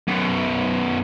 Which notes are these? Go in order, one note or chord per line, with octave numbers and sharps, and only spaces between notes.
F#2 B2